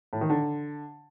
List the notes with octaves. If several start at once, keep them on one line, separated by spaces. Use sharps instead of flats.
A2
D#3
D3